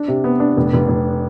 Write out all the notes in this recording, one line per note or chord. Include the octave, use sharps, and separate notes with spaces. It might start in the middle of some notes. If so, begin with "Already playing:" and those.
Already playing: D4
C3
B3
D4
F1
F1
F1